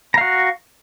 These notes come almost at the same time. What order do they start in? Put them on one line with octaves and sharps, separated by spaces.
A#5 F5 F#4